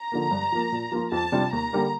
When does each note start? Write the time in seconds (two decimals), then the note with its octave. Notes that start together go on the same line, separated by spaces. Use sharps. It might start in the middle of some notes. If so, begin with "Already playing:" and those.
Already playing: A#5
0.12 D3 F3 A#3
0.31 G2
0.52 F3 A#3
0.72 A#2
0.92 F3 A#3 F4
1.12 F2 A5
1.32 C3 G3 D4 F4
1.53 D#2 A#5
1.73 D3 G3 A#3